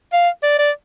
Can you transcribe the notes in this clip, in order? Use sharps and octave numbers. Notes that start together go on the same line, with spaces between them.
F5
D5
D5